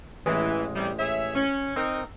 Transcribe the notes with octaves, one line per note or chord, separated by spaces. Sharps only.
A1 E3 G#3
C3 G3
G#4 C#5 E5
C#4
C4 D#4 A#4